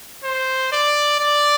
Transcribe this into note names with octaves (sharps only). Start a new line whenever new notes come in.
C5
D5
D5